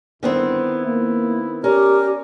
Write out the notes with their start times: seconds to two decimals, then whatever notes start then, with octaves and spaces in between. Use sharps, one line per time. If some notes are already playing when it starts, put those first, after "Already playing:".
0.23 G1 D#3 B3 C4 D4 E4
0.85 A#3 E4
1.64 C#4 G4 A#4 D5